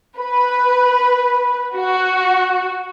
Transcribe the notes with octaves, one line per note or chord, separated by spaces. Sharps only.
B4
F#4